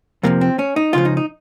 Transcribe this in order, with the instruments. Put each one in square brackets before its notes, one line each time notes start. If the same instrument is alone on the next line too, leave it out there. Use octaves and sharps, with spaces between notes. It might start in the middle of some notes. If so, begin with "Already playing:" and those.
[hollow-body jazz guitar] F2 C3 F3 A#3
C4
C#4
D#4
C#2 C#3 F3 F4
D#4
D#4